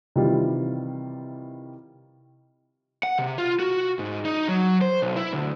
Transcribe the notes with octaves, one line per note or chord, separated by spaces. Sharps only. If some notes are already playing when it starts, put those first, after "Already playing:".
C3 D#3 E3 G3 F4
F#5
C3
F4
F#4
G#2
D#4
F#3
C5
B1
E4
D2